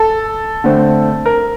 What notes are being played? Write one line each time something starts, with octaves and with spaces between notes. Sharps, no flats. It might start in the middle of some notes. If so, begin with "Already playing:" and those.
Already playing: A4
D3 A3 C4
A#4